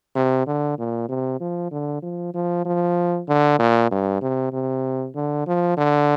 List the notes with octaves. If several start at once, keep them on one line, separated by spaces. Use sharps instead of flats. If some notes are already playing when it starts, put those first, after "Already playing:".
C3
D3
A#2
C3
F3
D3
F3
F3
F3
D3
A#2
G2
C3
C3
D3
F3
D3